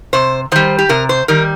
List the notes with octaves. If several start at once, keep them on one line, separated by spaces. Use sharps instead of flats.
C3 C5
D#3 G3 C5
G4
C3 A#4
C5
D#3 G3 A#4